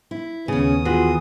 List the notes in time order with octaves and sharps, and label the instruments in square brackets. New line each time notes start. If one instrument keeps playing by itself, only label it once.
[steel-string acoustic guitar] E4
[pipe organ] D#2 B3 D#6 [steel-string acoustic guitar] C#3 C#4
[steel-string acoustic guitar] E3 [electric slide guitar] F4 F#4 G#4